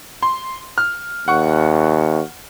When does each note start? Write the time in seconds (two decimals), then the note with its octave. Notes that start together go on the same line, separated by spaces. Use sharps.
0.22 C6
0.78 F6
1.28 D#2 F#5 C#6